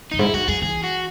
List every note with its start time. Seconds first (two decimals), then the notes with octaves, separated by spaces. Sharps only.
0.11 F#2 D#4
0.19 G#2 E4
0.33 F#2 F#4
0.48 F#2 G#4
0.62 E3 G#4
0.84 F#4